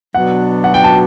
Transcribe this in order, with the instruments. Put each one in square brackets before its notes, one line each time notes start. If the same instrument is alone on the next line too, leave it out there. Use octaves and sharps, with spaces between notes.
[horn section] B2 F#3 B3 D4 F#4 [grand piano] F#5
[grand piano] F#5
G5
A5